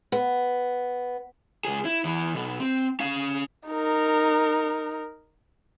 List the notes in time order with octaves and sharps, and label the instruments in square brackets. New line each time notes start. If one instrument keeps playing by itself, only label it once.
[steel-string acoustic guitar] B3
[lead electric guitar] C#2 G#4
E4
E2 E3
B2 F#3
C4
C#4 F5
[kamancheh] D#4 A#4